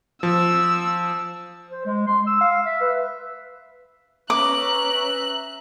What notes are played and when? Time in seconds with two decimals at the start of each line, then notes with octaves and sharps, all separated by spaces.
0.23 F3 E6
1.71 C5
1.86 G#3
2.07 C6
2.27 E6
2.41 F5
2.65 E5
2.81 B4
4.30 C#4 B4 E5 A#5 D6 F#6